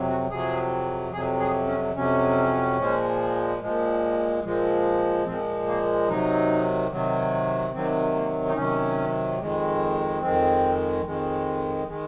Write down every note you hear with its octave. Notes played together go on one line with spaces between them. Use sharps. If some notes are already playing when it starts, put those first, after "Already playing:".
Already playing: F2 C3 F#3
F#4
F2 C3 F#3 G#4
F2 C3 F#3 G#4
G#4
C#4
F2 C3 F#3 C#4
A#2 F3 G#3
A#2 F3 G#3
A#2 F3 G#3
A#2 F3 G#3 C4
A#3
C3 D#3 F#3 D#4
C3 D#3 F#3
C3 D#3 F#3 C4
A#3
D#4
C3 D#3 F#3 C#4
F2 D#3 G#3
F2 D#3 G#3 C4
F2 D#3 G#3
D#3 G#3